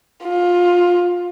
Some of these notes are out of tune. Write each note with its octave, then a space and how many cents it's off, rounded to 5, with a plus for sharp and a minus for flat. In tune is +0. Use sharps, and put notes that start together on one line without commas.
F4 +20